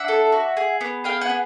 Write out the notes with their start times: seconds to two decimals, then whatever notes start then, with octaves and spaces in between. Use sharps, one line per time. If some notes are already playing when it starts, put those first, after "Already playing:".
Already playing: D4 E5 F#5
0.08 A4
0.32 F#4
0.57 G#4
0.81 B3
1.04 G#4 F5 G5
1.21 F#5 G#5
1.30 B3